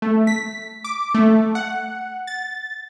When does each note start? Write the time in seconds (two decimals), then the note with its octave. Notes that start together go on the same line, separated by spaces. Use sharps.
0.02 A3
0.27 B6
0.84 D6
1.15 A3
1.55 F#5
2.27 A6